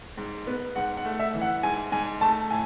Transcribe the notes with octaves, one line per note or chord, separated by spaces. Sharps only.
G#2
B3
G#2 F#5
F#5
A3
E5
E3
F#5
G#2 G#5
G#2 G#5
A3 A5
A2 G#5